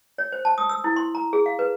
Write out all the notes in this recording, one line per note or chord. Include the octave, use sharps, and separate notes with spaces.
C#5
C5
A5
D#6
E6
E4
C6
A#5
G#4
F5
B4